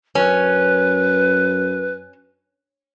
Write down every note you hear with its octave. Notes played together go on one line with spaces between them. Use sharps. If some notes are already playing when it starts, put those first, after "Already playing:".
F#2 C#4 B4